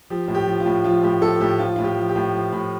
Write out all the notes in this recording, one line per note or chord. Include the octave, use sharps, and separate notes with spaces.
F3 G4
A2
G4
F3
F4
A2
F3 F4
A2 G4
F3 A4
A2 G4
F3 F4
A2 F4
G4
F3
G4
A2
F3
A2